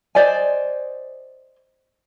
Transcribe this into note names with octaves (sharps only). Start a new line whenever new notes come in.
C5 D5 D#5 G#5